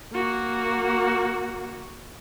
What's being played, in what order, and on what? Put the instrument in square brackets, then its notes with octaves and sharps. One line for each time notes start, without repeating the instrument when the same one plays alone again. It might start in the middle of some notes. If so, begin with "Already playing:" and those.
[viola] A#3 F#4